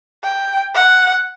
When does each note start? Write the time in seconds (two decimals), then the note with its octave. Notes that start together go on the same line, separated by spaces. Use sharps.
0.24 G5
0.75 F#5